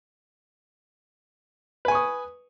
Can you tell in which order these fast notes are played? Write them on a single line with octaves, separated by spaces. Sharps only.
B4 G#5 C#6 D#6